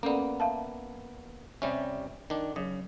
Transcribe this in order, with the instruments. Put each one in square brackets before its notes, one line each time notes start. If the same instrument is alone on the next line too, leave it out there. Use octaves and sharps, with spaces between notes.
[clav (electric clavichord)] A#3 B3 [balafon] C#4 A4 D5
[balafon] E5 F5 A5
[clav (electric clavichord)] C3 G3 C#4 [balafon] E5
[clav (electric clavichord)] D#3 D4
[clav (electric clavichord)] C#3 [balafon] F#3